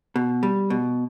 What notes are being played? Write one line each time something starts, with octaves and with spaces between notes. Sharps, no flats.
B2
G3
B2